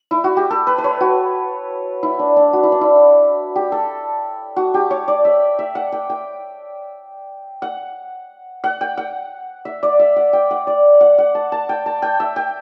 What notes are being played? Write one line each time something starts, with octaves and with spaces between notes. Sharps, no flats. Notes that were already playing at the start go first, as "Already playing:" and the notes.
Already playing: D4
E4
F#4
G4
A4
B4
B4
C#5
F#4
E4
D4
D4
F#4
E4
D4
E4
G4
A4
F#4
G4
C#5
D5
E5
E5
F#5
G5
G5
F#5
F#5
G5
F#5
E5
D5
E5
F#5
G5
F#5
D5
F#5
F#5
A5
A5
G5
A5
G5
E5
G5